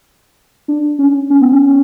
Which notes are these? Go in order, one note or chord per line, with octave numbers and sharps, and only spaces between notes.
D4
C#4
C#4
B3
C#4